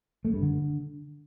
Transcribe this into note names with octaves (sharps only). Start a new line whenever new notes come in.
A3
G2
D3